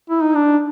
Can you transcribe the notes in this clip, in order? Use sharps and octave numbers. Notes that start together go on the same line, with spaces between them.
E4
D#4
D4